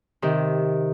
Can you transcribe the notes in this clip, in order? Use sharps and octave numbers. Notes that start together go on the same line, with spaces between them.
C3 D#3